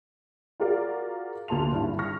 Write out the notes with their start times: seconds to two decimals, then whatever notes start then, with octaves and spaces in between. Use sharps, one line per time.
0.60 F4 F#4 G#4 A#4 D5 F5
1.48 D2 A#3 A5 C6 F7
1.72 G#1 G2 E4
1.99 C#6 F6 A#6